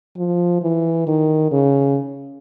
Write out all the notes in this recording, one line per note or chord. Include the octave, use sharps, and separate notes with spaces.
F3
E3
D#3
C#3